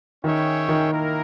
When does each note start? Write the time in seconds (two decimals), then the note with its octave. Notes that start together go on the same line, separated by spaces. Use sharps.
0.24 D#3 C#4 G#4 C#5 E5 G5
0.69 D#3
0.90 A#3 E4 A#4